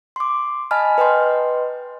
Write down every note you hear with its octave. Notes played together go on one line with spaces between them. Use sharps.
C6 D6
D#5 G#5 A5 B5 F6
B4 D#5 G5 C6